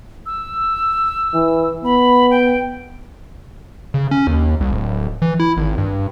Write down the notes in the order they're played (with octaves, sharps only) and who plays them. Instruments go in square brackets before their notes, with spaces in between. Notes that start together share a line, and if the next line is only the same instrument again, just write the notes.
[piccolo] E6
[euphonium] E3
[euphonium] B3 [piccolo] B5
[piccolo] G5
[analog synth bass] C#3
C#4
D#2
C2
D1
E3
E4
G#1
G2